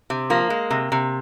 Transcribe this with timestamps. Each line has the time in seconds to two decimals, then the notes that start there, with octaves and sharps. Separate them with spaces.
0.10 C3
0.30 F3 A#3
0.50 G#3
0.70 C3
0.92 C3